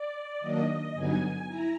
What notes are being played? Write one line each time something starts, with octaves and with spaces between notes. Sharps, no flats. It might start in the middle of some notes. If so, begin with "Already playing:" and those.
Already playing: D5
D#3 F#3 A#3 D4 D#5
G2 D3 F#3 B3 D#4 G#5
E4 A#5